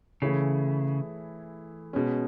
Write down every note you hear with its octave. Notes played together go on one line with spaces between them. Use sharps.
C#3 E3 A3 E4 G#4 C#5
B2 G#3 C#4